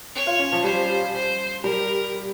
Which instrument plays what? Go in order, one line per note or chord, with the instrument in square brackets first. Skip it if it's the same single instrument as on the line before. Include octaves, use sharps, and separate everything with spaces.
[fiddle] C#5
[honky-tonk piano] F4
C#4
F3
[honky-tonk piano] G3 [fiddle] C5
[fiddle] C5
[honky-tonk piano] G3 [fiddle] A#4